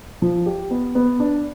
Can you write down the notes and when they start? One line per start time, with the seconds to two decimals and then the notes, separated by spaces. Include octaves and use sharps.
0.22 F3
0.46 G4
0.70 B3
0.95 B3
1.20 D4